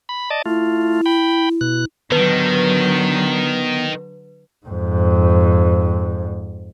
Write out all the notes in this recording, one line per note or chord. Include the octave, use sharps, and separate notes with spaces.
B5
D5 D#5 A5
A3 E4 F4
G5 B5
B2 F#6
D3 D#3 F#3 B3 B4 A5
F2 G#2